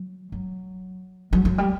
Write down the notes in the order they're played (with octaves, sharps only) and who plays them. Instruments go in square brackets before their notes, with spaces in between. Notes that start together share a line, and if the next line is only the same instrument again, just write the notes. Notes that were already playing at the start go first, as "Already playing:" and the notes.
Already playing: [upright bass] F#3
F#3
F#3
F#3
G3